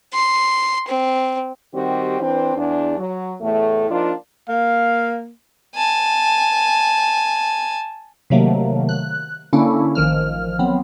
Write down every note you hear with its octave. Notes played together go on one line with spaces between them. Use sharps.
C6
C4
D#3 G3 C4 F#4 G4
E3 C4 D4 B4 C5
E2 D4
F#3
E2 A2 A3
F3 A#3 D4 D#4 F4
A#3 F5
G#5 A5
C3 D#3 F#3 A3 A#3
F#6
D3 A#3 C#4 D4 E4
A1 D#3 F3 F6
F#3 B3 C4